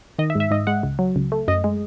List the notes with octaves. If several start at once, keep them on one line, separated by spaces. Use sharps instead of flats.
D#3 D#5
E5
G#2
E5
G#2 D#5
G#3 F#5
C#2
F#3
C#2
A3
F#2 D#5
G#3